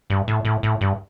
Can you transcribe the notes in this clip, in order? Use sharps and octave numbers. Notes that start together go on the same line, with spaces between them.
G2
A2
A2
A2
G2